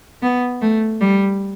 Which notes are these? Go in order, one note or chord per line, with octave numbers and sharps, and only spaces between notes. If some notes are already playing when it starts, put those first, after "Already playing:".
B3
A3
G3